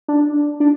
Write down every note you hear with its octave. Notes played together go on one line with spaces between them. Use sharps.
D4
D4